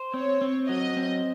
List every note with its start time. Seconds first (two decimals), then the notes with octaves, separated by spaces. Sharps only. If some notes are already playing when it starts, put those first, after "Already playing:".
Already playing: C5
0.13 C4 C#5
0.41 C4
0.68 F#3 D#5
0.97 C4